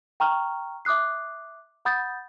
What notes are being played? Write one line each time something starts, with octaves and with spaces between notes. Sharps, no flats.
G5 A#5 C#6 F6
E5 D6 D#6 F#6 C7
F#5 B5 D#6 G6 A6